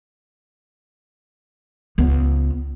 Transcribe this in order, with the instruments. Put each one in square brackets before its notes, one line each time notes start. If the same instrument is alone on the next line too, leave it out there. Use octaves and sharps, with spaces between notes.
[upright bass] C#2 B3